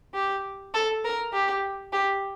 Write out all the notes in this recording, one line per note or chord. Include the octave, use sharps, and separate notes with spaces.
G4
A4
A#4
G4
G4